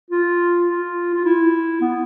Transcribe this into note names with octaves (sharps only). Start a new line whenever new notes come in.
F4
F4
F4
E4
B3